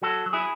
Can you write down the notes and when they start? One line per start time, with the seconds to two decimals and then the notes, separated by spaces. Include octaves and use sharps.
0.02 F#3 F#4 A4
0.26 F#3
0.33 E4 G#4